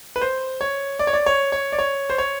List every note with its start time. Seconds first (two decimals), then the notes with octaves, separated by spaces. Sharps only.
0.16 B4
0.22 C5
0.61 C#5
0.99 D5
1.07 C#5
1.13 D5
1.26 C#5
1.52 C#5
1.72 D5
1.79 C#5
2.10 C5
2.18 C#5